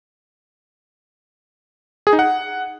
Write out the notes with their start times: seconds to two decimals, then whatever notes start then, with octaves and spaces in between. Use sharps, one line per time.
2.07 G#4
2.13 D#4
2.19 F#5